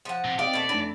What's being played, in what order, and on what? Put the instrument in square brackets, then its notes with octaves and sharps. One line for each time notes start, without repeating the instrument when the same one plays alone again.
[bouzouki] F3 F#5
[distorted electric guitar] C3
[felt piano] C4 D#5 F5 [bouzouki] G4 [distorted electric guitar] D5
[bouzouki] B2 A3
[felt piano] F1 D4 [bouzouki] E3 A4